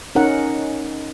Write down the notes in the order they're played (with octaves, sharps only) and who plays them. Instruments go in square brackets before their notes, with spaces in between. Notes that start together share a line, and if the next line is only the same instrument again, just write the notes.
[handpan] C#4 D#4 A#4 F#5